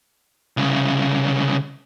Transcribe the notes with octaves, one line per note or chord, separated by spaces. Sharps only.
C2 C#3